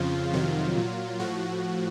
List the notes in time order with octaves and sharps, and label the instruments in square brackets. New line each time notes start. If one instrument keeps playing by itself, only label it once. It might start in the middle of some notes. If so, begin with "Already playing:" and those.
Already playing: [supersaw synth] F2 C#3 F3 F4
F2 C3 D#3 F#3 F4
A#2 F#3
A2 F3 F#4